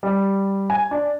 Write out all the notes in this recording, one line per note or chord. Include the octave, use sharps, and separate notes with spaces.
G3
G#5
D4